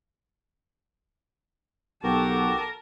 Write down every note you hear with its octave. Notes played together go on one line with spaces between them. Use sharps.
B1 F#4 G4 A4 A#4 A5